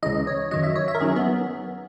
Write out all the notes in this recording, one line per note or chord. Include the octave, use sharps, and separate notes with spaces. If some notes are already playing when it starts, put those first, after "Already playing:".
C#2 C#3 E3 D#5
C#5
F#2 D#3 F#3 D#5
E5
C#5
E5
A#4
F#2 D#3 F#3 G#4
B3